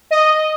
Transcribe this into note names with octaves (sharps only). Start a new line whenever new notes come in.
D#5